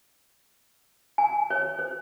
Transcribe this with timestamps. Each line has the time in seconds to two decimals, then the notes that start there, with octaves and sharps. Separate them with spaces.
1.18 G#5
1.50 C#5
1.79 C5